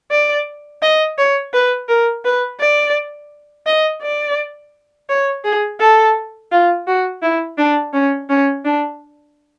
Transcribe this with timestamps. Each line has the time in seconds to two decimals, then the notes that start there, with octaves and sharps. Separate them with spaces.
0.11 D5
0.82 D#5
1.18 C#5
1.54 B4
1.88 A#4
2.25 B4
2.60 D5
3.66 D#5
4.02 D5
5.09 C#5
5.44 G#4
5.80 A4
6.52 F4
6.87 F#4
7.23 E4
7.58 D4
7.93 C#4
8.29 C#4
8.65 D4